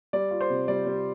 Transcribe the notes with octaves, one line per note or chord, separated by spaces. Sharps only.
G3 D5
F4
C5
C3
G3 D5
G3